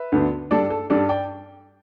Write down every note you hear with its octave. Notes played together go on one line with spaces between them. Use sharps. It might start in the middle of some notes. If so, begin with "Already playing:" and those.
Already playing: B4 E5
D2 D3 B3 D4
G2 G3 D4 A4 D5
A4
G2 G3 D4 A4 D5
D5 G5